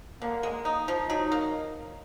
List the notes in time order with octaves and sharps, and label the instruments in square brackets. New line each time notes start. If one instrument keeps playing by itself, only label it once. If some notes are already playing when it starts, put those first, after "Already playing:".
[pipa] D3 [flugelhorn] A#3
[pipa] G#3
D#4
F3
[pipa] F#3 [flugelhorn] D#4
[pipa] A#3